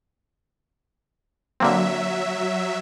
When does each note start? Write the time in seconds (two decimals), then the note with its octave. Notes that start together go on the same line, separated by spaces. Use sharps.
1.60 D3 F#3 A#3 C4 E5